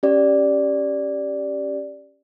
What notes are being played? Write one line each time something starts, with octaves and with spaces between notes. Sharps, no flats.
C#4 G4 D5